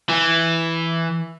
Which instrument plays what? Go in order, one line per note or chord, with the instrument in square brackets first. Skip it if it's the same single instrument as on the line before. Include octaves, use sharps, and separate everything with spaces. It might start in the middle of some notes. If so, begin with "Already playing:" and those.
[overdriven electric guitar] E3